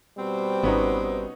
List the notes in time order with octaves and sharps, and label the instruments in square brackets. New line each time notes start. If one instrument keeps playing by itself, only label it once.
[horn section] B2 G3 C4
[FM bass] G#1 [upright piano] B3 C#4 D#4